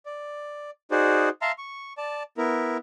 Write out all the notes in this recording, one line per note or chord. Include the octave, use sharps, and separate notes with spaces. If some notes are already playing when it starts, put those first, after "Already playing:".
D5
D#4 F#4 G#4 C5 D5
E5 F5 A5 A#5 C6
C#6
D5 A5
B3 E4 A#4